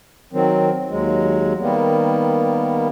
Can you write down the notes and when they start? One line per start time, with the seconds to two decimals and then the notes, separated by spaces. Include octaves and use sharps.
0.33 D#3 F#3 C4
0.90 D#2 F#3 G#3
1.60 D#3 G3 A#3 B3